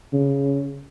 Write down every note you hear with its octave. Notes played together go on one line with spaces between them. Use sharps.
C#3